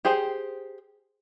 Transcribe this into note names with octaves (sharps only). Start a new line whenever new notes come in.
G4 G#4 C5 G5